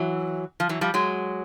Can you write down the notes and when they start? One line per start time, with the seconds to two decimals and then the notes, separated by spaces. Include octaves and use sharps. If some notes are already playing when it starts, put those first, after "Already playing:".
Already playing: E3 F#3
0.60 F3
0.69 E3 F#3
0.81 F3 G3
0.94 F#3 G#3